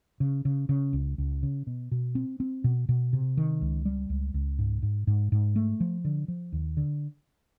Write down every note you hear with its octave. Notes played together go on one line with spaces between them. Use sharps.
C#3
C#3
C#3
C#2
C#2
C#3
B2
B2
C4
C4
B2
B2
C3
D#3
C#2
G3
C#2
C#2
G#2
G#2
G#2
G#2
A3
F3
D3
F3
D#2
D3